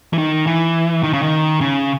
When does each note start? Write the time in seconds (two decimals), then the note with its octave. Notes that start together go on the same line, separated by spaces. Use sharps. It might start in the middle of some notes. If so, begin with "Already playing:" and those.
0.13 E3
0.18 D#3
0.47 E3
1.03 D#3
1.13 C#3
1.23 D#3
1.61 C#3